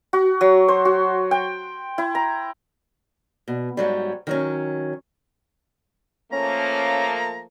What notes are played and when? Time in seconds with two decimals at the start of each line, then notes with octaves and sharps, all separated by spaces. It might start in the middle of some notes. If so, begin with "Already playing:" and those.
0.13 F#4
0.41 F#3
0.68 C5
0.85 F#4
1.31 G5
1.98 E4
2.15 A#5
3.48 B2
3.77 G#2 F#3 G3
4.27 D#3 F#3 C#4
6.32 F3 A3 A#3 C#4 A#5